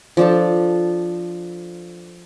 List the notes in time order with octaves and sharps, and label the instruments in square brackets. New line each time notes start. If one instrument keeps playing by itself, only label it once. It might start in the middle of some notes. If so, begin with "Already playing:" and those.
[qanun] F3 D4 A4